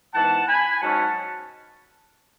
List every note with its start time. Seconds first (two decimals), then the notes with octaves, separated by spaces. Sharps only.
0.15 G#2 E3 B3 F#5 A5
0.48 G#5 B5
0.81 G#2 F#3 C#4 F#5 A5